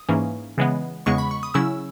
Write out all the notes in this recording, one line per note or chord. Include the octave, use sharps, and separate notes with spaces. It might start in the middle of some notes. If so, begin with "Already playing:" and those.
Already playing: D#6
G#2 E3 A#3 C#4
C#3 E3 G#3 B3
E2 C#3 G#3 B3 C#6
B5
C#6
D#6
C#3 F#3 C#4 E4 E6